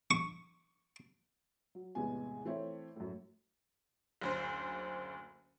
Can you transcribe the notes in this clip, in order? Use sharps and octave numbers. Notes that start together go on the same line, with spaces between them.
C#6
F#3
A1 E2 C3 G#3 B3 G#5
E3 A3 C4 C#5 E5
F#2 A2
F#1 D2 C5